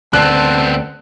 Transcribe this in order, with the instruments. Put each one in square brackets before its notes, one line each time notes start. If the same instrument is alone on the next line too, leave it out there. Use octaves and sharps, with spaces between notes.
[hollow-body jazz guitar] D2 [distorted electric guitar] B3 C4 [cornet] A5 [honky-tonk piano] F#6